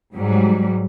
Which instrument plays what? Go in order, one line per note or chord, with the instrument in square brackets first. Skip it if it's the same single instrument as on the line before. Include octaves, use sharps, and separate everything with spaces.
[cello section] G#2 F#3 G3